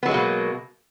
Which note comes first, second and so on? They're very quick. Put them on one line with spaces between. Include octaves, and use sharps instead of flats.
B3 F#3 G#3 A#3 B2